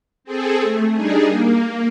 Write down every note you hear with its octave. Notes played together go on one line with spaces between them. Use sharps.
C4 G#4 A4
A3
G3 D4 D#4 G#4
A#3